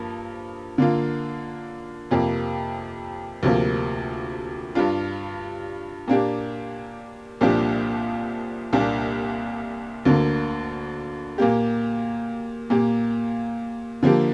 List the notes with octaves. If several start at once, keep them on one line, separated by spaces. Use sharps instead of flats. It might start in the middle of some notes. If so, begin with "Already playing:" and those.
Already playing: G2 F3 A#3
D3 A#3 F4
F2 C3 A#3 F4
D2 C3 F3 A#3
G2 G3 D4 F4
A#2 A#3 D4 G4
C2 A#2 F3 D4 G4
C2 A#2 A#3 D4
D2 D3 A#3
A#2 A#3 G4
A#2 A#3 G4
D3 F3 A#3 G4